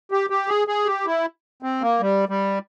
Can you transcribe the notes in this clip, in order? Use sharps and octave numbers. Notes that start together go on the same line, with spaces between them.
G4
G4
G#4
G#4
G4
E4
C4
A#3
G3
G3